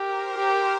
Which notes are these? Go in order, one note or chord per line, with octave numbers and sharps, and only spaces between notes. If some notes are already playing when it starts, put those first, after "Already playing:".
Already playing: G4 A#4
C5
G4